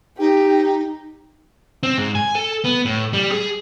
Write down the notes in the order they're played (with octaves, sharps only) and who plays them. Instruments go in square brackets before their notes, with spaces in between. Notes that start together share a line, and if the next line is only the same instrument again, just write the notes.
[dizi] D#4 [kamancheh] G4
[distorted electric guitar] C4
G#2
G#5
A4
B3
A2
G3
G#4